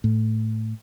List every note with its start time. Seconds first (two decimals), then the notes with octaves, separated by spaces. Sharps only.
0.04 A2